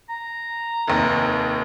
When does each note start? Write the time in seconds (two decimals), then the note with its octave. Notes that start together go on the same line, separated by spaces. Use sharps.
0.09 A#5
0.87 F1 D#2